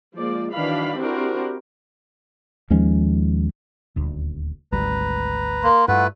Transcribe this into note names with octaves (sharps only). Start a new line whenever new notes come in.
F3 G#3 A#3 D5
D#3 E3 F#3 D4 F5 B5
C4 D4 E4 F#4 G4 A#4
D#2 F3 G#3 C#4
D#1 D2
G#1 D2 G3 B4 A#5
A#3 C6
G2 A3 E4 F4 B4 F#5